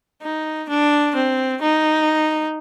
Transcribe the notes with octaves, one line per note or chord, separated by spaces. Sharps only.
D#4
D4
C4
D#4